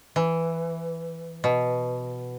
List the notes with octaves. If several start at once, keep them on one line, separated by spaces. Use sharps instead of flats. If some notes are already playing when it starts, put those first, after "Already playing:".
E3
B2